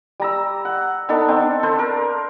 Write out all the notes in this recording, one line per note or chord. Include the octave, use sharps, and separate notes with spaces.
G3 A#5 E6
F#5
B3 D4 D#4 A4
C4 D4
A4 B4 C5 A5
A#4